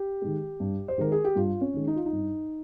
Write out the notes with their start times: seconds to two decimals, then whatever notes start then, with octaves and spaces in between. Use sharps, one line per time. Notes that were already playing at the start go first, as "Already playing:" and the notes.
Already playing: G4
0.22 D#3 G#3
0.60 G2
0.88 C5
0.98 D#3 G#3 A#4
1.12 G#4
1.24 G4
1.36 G2 F4
1.61 C#4
1.74 D#3 G#3
1.87 D#4
1.96 F4
2.06 D#4
2.12 G2